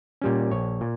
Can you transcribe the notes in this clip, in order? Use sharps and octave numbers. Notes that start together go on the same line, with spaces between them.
A#2 G3 C#4
A#1 C#5
A#2